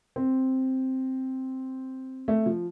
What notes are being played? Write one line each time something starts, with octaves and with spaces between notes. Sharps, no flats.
C4
A3
F3